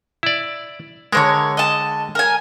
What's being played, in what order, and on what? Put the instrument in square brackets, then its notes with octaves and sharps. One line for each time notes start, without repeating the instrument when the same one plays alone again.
[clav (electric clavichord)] E4 D5
[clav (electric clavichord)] D3 G#3 [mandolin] A#4 C5 C#5
[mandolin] D#5 A5
A#4 G#5